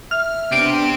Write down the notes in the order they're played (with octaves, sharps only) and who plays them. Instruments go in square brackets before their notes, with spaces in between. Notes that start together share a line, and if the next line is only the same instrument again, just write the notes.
[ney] E5 [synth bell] F6
[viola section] B3 D4 [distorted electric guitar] C4 G4 [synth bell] D7